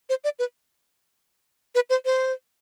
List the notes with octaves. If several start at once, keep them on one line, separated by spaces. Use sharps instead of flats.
C5
D5
B4
B4
C5
C5